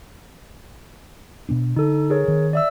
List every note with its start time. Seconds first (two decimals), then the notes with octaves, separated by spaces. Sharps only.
1.49 B2 B3 D4
1.76 D3 D#4 A4
2.10 G#4 A#4 C#5
2.28 D#3 C4
2.53 D5 E5 E6